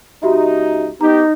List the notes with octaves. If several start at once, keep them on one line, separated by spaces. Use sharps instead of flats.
C#2 D#4 F#4 G4 E5
B3 D#4 G4 A#5